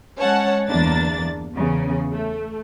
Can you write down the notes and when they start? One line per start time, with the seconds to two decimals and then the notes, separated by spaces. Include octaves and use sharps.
0.20 G#3 C#4 C#5 F#5 A5
0.67 G1 E2 A#3 D4 A6
1.55 E2 C#3
2.13 A3